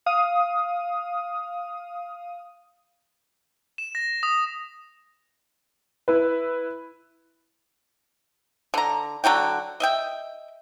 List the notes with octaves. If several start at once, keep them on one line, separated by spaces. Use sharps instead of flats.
F5 D#6
E7
A#6
D#6
E4 B4
D3 A#5
D3 F#3 F#4 G5
D#5 E5 G5